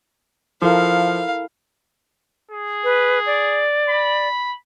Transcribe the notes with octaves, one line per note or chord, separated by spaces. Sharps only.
F3 E4 A4 A#4 F5
G#4
B4
D5
B5